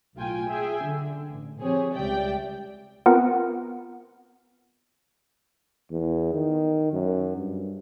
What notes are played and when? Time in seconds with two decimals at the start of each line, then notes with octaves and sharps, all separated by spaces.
0.16 B1 A2 F4 G5 G#5
0.48 G#4 E5 G5 G#5
0.85 D3
1.30 A1
1.61 F3 C4 G4 G#4 C#5
1.94 C#2 G3 G4 D5 E5 G5
3.06 B3 C4 F4 A#4 F#5
5.91 E2
6.33 D#3
6.93 F#2
7.37 G2